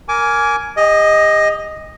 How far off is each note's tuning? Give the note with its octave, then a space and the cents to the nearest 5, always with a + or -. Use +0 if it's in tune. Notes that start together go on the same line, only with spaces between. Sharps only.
A#4 +0 G#5 +10 D6 -20
G4 +45 D#5 +5